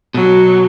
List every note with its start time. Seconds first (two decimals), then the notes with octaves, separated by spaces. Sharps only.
0.14 B2 F#3